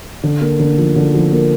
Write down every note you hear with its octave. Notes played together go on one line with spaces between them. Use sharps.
D3
A#3
D3
F3
D3
F3
A#3